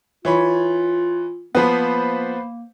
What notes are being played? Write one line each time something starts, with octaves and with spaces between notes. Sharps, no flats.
E3 F4 C#5 B5
F3 A#3 B3 B4 C5 B5